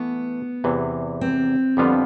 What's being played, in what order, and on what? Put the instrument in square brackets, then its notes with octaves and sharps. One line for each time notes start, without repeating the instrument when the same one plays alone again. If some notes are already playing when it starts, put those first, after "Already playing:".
Already playing: [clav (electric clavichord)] E3 A3 [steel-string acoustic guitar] B3
[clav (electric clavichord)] E2 C3 E3
[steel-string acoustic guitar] C4
[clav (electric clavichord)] F2 D3 G3 B3 F4